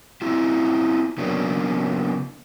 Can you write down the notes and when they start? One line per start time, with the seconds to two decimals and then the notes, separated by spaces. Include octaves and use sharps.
0.22 C4 E4 F4
1.18 C#3 F#3 A#3 B3 D4